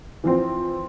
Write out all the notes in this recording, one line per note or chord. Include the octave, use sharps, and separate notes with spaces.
E3 F3 C4